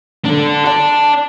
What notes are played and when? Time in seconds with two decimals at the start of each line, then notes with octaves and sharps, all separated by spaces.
0.25 D4 A4
0.66 D5 A5